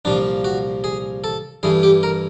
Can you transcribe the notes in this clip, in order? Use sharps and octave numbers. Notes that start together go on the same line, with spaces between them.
C2 A#2 F3 D4
F#4
G#4
A4
G2 E3 A3 G#4
G4
A#4